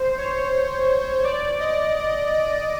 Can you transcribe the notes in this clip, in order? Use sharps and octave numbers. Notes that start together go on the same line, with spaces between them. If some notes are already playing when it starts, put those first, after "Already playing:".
Already playing: C5
C#5
D5
D#5
D#5
D5